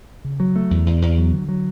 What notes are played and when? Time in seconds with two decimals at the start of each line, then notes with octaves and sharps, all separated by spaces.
0.24 C#3
0.40 F#3
0.56 A3
0.71 E2
0.86 E2
1.02 E2
1.18 F#3
1.33 D3
1.49 F#3